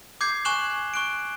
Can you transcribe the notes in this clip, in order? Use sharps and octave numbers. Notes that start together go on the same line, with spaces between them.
D6 G6 G#6 C7
G#5 C#6 F#6 E7 F#7
C#6 F#6 D7